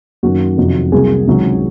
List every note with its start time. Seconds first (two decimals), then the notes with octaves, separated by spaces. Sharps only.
0.23 F#2 D#3 F#3 A#3 F#4
0.57 F2 C3 D#3 F#3
0.92 C2 C3 F#3 A#3 G#4
1.27 C#2 C3 D#3 F#3